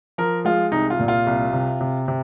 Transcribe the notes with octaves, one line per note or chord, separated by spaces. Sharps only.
F3 A#4
G#3 F4
C2 D#4
F4
A#2
F4
C2
C3
C3
C3